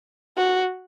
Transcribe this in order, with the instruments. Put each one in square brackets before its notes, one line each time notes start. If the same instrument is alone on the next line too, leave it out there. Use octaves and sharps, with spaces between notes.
[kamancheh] F#4